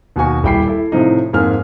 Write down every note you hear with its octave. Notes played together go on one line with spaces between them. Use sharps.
D#2 B2 F#4 G#5 C#6
D#1 G3 E4 G5 B5 C7
E4 A4
A2 C3 F3 D#4
F2 G#2 A#3 G#4 F6